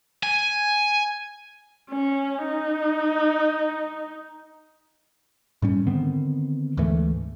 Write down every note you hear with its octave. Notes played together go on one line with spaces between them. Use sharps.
G#5
C#4
D#4
G#2 G3 C#4
D3 D#3 B3 C4
D2 G#2 E3 A3